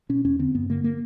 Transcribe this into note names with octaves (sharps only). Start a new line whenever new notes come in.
B2 C#4
E2 C#4
D3 C4
G2 B3
D3 A#3
A#3